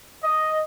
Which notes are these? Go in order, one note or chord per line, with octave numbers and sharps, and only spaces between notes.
D#5